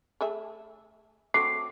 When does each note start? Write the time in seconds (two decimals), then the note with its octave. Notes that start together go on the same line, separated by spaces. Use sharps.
0.21 A3 G#4 E5
1.34 F#3 A3 C4 D6 C7